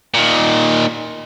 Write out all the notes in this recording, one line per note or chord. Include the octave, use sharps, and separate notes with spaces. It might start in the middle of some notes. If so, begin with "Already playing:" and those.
A#2 D#3